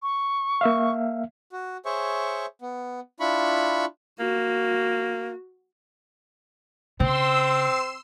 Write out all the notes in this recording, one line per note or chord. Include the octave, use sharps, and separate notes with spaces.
C#6
A#3 E5 F5
F#4
G#4 C5 C#5 E5 C#6
B3
D4 E4 F4 B5 C#6
A#3 F#4
C#3 C4 C6 E6